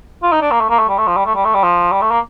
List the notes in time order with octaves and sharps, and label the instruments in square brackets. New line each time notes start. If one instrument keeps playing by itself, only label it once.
[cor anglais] F4
D#4
D4
A#3
A3
A#3
A3
G3
A3
F3
G3
A3
G3
A3
G3
F3
G3
A3
A#3